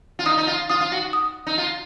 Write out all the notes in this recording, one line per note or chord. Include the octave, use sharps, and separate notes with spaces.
F4
D#4 D#6
D#4
F4
F4 D#6
F4
F#4
D#6
D#4
F4